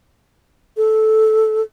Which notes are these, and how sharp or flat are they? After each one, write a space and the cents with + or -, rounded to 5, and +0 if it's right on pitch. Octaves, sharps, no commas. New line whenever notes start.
A4 -10